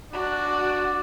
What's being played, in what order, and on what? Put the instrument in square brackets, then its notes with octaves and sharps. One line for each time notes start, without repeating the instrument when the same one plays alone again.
[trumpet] D4 [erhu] F#4